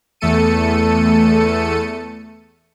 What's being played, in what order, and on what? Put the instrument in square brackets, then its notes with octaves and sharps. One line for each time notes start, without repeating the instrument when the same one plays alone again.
[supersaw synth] E2 A3 A4 C#7 D#7